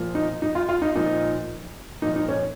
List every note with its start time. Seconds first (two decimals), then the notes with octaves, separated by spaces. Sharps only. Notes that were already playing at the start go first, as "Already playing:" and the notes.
Already playing: A#2 F3
0.15 D#4
0.42 D#4
0.55 F4
0.69 F4
0.82 D#4
0.95 A#2 F3 D#4
2.02 A#2 F3 D#4
2.16 D#4
2.29 C#4